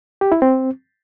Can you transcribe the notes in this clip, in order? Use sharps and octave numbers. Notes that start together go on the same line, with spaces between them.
G4
E4
C4